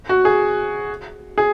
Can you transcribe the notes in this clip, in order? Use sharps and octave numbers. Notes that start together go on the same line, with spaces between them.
F#4
G#4
G#4